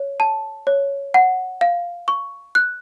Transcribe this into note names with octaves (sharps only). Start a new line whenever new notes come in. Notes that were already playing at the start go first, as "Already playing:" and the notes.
Already playing: C#5
A5
C#5
F#5
F5
C#6
F#6